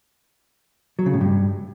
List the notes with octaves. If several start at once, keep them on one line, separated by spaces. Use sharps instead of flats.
F#3
C#3
A2
G2